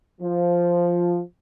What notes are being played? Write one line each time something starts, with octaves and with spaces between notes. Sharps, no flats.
F3